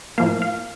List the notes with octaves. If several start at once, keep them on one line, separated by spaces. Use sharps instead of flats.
A2 F3 A#3 F5
F5